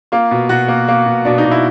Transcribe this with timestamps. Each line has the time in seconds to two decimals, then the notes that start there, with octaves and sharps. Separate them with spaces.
0.12 A#3 F4
0.31 B2
0.49 B2 F#4
0.68 A#3
0.88 A#3
1.06 B2
1.25 B2 D4
1.38 D#4
1.44 B2
1.51 E4